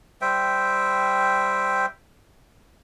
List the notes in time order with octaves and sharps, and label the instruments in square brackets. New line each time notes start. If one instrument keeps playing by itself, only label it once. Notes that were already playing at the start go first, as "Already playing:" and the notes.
[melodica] G3 C5 E5 G5